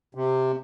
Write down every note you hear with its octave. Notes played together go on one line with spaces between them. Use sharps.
C3